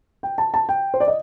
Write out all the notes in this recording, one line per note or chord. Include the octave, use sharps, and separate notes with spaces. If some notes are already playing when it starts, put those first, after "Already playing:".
G5
A5
A5
G5
C5
D5
D#5